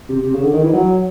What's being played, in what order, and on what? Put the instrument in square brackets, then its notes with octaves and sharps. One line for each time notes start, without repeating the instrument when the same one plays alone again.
[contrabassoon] C3
C3
C#3
D3
D#3
E3
F#3